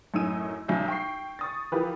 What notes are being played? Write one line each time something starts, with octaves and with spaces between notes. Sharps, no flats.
F#2 A2 C#4 D#4 E6 D#7
B1 F#3 G3 C#4 E5 G6
G5 C#6 C7
C#6 D#6 A6
E3 F3 G4 A#4 B4